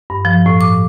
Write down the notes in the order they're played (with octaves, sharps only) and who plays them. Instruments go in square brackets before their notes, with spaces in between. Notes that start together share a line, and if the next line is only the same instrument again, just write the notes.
[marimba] G2
F3
A2
D6